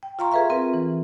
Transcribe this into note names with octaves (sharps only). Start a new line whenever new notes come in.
G5
F4 F5 A#5 C6 C#6
G#4 A4 B4 E5 F5
C4 F4 A#4 B4
E3